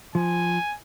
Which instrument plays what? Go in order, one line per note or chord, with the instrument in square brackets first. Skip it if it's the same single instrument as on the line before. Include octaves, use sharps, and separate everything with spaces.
[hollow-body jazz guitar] F3 [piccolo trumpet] G#5